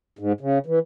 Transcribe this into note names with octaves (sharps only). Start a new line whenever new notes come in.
G#2
C#3
E3